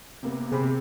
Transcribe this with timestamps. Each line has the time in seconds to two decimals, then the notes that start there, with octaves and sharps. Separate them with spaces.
0.23 C3 A#3 B3
0.52 C3 C4 G#4 C5 B5